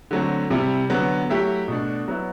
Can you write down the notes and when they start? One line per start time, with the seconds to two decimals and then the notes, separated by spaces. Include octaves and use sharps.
0.11 D3 F#3 A3 C4
0.50 C3 G3 C4 E4
0.90 D3 F#3 B3
1.29 F#3 A3 E4 G4
1.68 B2 A3 D4
2.08 F#3 B3 E4